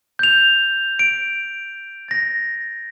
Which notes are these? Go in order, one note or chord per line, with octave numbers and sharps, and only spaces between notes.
G6 F7
D7
A6 A#6